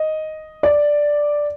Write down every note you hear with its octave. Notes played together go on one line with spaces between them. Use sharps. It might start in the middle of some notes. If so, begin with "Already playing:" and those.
Already playing: D#5
D5